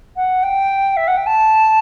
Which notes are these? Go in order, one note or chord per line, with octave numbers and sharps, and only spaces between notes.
F#5
G5
E5
F#5
G5
A5